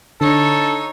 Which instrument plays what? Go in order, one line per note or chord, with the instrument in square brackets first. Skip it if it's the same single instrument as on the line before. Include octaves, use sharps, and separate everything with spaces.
[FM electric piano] D3 [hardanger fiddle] D#4 C#5 [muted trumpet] A4